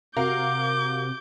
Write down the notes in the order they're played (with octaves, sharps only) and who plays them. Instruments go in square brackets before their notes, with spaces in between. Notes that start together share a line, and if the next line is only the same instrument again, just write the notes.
[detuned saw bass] C3 [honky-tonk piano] F#4 A#4 F5 [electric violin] D6 G6